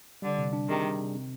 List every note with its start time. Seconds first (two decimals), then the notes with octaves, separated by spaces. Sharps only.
0.22 D3 G3
0.38 C3
0.53 D4
0.68 C3 D#3 G#4
0.84 G3
1.00 C3
1.15 C4